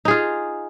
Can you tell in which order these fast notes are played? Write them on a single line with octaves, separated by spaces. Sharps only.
D#4 G#4 F4